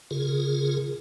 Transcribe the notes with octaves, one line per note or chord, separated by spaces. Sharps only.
C#3 F4 G#4 A#4